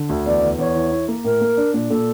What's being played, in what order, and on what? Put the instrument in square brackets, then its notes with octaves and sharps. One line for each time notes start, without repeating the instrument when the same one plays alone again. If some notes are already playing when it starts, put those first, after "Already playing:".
Already playing: [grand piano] D3
D2
[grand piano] E2 [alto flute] D5
[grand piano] E2
[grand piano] E2 [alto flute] C#5
[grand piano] E3
E4
A#3
[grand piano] A2 [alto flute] A#4
[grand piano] A#3
D4
A#2
[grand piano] A#2 [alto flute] A4